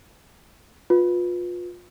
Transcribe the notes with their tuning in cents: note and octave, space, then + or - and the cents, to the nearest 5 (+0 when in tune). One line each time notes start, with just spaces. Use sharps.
F4 +25 B4 -5